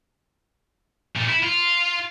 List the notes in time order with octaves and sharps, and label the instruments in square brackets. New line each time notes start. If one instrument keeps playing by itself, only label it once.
[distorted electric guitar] A#2 A3
E4
F4